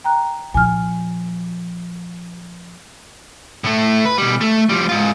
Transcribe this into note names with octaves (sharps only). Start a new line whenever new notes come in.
G5 A#5 F#6
A#2 F3 G#5 F6
A2 A3
B4
B2 G3
A3
F3 G3
G#2 F4